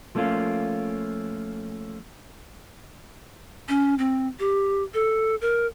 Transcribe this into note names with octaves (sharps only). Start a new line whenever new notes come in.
F3 A3 A#3 C#4 F4
C#4
C4
G4
A4
A#4